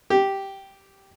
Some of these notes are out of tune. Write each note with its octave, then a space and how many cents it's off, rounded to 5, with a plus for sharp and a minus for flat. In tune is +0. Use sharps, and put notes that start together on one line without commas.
G4 -5